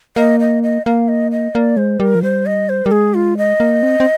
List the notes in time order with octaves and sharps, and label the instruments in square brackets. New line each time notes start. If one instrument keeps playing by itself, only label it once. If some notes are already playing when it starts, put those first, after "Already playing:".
[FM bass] A#3 [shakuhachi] D#5
[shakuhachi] D#5
D#5
[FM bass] A#3 [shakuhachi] F5
[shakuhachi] D#5
D#5
[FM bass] A#3 [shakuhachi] D5
[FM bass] G#3 [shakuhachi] C5
[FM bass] G3 [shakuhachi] A#4
[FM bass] F3
[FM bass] G3 [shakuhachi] C5
[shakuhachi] D#5
C5
[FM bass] G3 [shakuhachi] A#4
[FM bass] G#3 [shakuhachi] G#4
[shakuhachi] F4
D#5
[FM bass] A#3
C4
C4